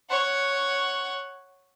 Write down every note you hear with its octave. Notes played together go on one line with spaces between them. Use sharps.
C#5 F#5